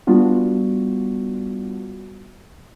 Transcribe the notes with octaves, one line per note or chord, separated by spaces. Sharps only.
G3 B3 D4 F4 F#4